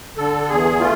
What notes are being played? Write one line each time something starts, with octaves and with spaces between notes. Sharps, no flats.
D3 A4
E2 G#4
A3 F4